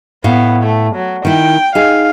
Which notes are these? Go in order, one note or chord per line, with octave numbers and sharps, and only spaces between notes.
A2 B3 F5
A3
F#3
D#3 E4 G5
D#4 G#4 F5